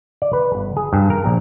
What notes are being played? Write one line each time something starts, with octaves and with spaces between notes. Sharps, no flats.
D5
B4
G1
G#4
G2
A#4
A#1